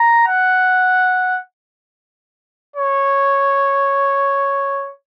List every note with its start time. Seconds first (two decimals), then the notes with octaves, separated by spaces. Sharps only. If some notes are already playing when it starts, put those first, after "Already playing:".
Already playing: A#5
0.27 F#5
2.76 C#5